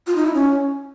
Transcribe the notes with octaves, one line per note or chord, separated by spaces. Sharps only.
F4
D#4
E4
C#4